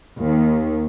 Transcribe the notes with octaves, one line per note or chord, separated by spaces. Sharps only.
D#2